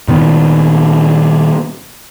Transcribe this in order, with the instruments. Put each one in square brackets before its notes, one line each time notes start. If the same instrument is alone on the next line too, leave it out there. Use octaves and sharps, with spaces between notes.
[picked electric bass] A#2 D#3 B3